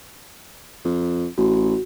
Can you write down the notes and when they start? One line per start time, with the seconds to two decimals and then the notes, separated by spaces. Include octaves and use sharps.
0.84 F2
1.38 A1 F#4